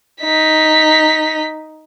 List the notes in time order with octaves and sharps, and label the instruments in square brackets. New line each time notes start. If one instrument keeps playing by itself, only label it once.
[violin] D#4 B6